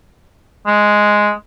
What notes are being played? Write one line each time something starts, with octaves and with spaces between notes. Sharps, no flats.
G#3